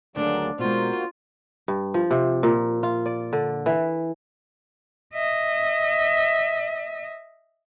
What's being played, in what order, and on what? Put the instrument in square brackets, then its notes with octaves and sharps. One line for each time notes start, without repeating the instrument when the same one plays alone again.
[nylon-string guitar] D2 D#3 [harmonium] F#3 G#3 A#3 [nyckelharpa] D4
[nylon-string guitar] B2 G#3 [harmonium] A#3 F#4 C5 [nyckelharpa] F4
[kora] G2
F3
C3
A#2
F4
D5
D3
E3
[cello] D#5 E5